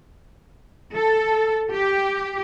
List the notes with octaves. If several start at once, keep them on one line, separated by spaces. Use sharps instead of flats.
A4
G4